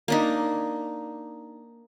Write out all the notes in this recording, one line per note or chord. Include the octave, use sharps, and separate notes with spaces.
A#3 D4 D#4